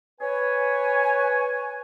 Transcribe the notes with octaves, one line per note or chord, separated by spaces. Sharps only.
B4 C#5 G#5